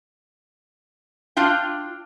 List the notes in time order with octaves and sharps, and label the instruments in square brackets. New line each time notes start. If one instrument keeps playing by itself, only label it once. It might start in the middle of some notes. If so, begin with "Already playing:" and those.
[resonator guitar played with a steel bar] D4 F4 G5